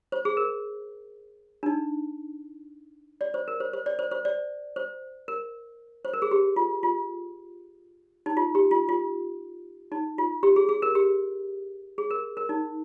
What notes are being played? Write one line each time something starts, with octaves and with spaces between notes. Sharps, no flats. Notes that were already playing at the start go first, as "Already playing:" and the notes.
C5
G#4
A#4
D4
D#4
D5
C5
A#4
C5
C5
D5
C5
C5
D5
C5
A#4
C5
A#4
G#4
G4
F4
F4
D#4
F4
G4
F4
F4
D#4
F4
G4
G#4
G#4
A#4
G4
G#4
A#4
A#4
D#4